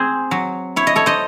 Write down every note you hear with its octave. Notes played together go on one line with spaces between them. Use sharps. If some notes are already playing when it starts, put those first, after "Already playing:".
Already playing: C4 G#4 C5
F#3
E4 C#5
D#5
A4 C#5
C5 D#5